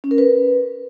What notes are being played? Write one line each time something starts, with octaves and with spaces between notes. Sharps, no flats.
C#4
A#4
B4